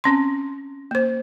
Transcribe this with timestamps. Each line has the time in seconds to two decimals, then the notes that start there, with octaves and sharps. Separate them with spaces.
0.04 C4 C#4 C6
0.91 A#3 C5